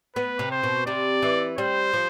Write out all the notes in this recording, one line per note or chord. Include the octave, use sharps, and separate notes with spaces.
B3 B4
C3
C5
B2
C3 D5
E3
G3 C5
F3